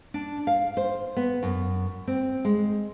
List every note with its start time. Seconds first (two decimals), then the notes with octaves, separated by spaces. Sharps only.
0.14 D4
0.47 F5
0.77 C5
1.17 B3
1.43 F#2
2.08 C4
2.45 G#3